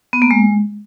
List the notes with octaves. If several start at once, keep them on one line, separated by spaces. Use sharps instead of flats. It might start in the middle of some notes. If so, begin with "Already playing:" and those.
B3
A#3
G#3